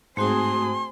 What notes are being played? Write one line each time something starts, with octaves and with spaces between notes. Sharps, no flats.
G#2 A3 C4 F#4 G#4 C5 C6 D#6